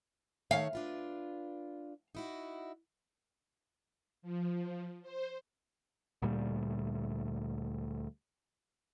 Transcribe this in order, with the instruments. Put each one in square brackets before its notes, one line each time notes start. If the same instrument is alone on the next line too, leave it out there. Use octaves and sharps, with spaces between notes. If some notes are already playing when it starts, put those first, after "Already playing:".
[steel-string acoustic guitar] D#3 A3 C#5 [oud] F5
[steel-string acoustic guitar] D4 F4 B4
D#4 E4 F#4
[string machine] F3
C5
[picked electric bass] D2 A#2 G3